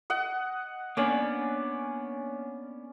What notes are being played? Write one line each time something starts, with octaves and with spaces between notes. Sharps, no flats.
D#5 F#5
A#3 B3 C#4 D4 D5 G#5